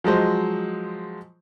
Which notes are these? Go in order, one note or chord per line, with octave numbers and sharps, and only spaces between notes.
F3 F#3 G#3 C5